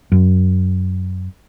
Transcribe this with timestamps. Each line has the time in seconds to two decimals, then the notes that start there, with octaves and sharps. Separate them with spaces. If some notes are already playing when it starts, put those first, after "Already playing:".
0.12 F#2